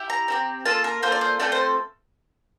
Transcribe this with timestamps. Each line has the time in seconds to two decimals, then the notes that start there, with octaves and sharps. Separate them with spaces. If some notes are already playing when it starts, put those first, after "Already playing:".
Already playing: E4 G4
0.10 A#5
0.28 C4 E4 G4
0.65 A#3 F4 A4 A5
0.84 A#4
1.03 A#3 F4 A4 C5
1.12 D5
1.21 C5
1.40 A3 C4 F4 A4 D5
1.52 C5